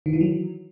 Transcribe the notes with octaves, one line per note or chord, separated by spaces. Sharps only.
D#3
E3
F#3